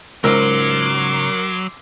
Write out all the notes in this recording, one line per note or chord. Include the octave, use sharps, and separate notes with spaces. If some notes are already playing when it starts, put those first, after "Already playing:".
C#2 G#2 F#3 A#4 C6 D6 E6